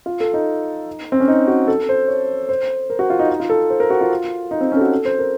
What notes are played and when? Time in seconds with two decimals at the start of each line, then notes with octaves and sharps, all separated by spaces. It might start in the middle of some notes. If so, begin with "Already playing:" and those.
0.06 F4
0.20 A4
0.34 D#4
1.12 C4
1.20 C#4
1.28 D#4
1.48 F#4
1.68 A4
1.89 C5
2.08 C#5
2.49 C5
2.90 A#4
2.99 F#4
3.10 F4
3.19 D#4
3.30 D#4
3.40 F4
3.50 A4
3.70 C5
3.80 A#4
3.90 F#4
4.01 F4
4.51 D#4
4.61 C4
4.72 C#4
4.77 A4
4.81 F#4
4.92 A4
5.05 C5
5.19 A#4